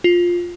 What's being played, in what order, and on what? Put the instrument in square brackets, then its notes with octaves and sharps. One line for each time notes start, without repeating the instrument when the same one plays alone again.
[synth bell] F4